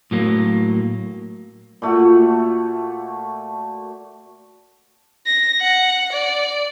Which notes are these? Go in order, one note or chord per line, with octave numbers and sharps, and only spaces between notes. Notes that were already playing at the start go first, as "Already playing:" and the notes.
A2 F#3 A#3
A#2 A3 F#4
A#6
F#5
D5